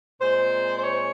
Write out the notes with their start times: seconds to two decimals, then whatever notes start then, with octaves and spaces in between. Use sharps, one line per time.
0.20 A#2 G#3 C4 C5
0.77 C5
0.83 C#5